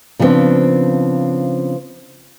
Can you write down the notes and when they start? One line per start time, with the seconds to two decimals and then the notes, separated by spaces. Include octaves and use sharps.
0.19 C#3 F3 G3 B3 C4 D4